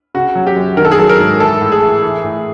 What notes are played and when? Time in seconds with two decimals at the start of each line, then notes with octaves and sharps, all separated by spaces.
0.14 C#3 F#4
0.35 F#3
0.47 G4
0.56 F#2
0.77 D#3 A#4
0.85 A4
0.92 G#4
0.99 F#3 A4
1.09 A#4
1.19 G#2
1.40 E3 A4
1.61 A2
1.72 G#4
1.82 E3
2.02 E3
2.24 A2